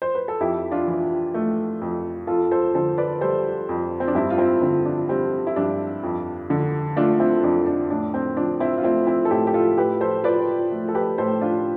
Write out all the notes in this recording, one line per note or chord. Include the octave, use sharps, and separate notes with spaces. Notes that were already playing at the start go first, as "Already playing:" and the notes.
C5
B4
A4
F2 E4 G4
D4 F4
E3
A3
F2
F2 F4 A4
A4 C5
D3 A4 C5
B4 D5
G3 A4 C5
F2
C4
D4
G2 C4 E4
F4
C4 E4
D3 C4
D4
G3 C4
E4
G2 D4
F2
D3
A3 D4 F4
C4 E4
F2 D4
D4
A2 D4
C4
F3 D4
C4 E4
F4
A3 C4 E4
C4 E4
A4
A2 E4 G4
G4
F4 A4
A2 G4 B4
A4 C5
F3 B4 D5
A3
A4
G4 B4
A2 A4 C5
D4 F4